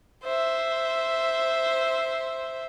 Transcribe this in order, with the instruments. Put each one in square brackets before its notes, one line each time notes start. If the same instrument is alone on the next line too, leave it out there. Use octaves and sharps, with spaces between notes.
[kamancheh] C5 E5